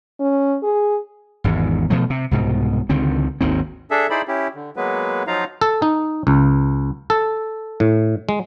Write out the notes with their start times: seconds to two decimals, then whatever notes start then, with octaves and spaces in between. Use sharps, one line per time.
0.20 C#4
0.63 G#4
1.44 G#1 E2 G#2
1.90 B2 F3 A3
2.10 C3
2.31 C2 G#2 B2
2.89 C#2 D3 D#3 C4
3.41 G#1 D#2 D#3 C4
3.91 D4 G#4 A4 E5
4.10 D#4 E4 G#4 C5 D5 B5
4.28 C#4 E4 G4
4.55 D3
4.76 F#3 G#3 A#3 B3 B4
5.27 F3 F#3 D#4 F4 F5 A#5
5.61 A4
5.82 D#4
6.27 C#2
7.10 A4
7.80 A2
8.29 G#3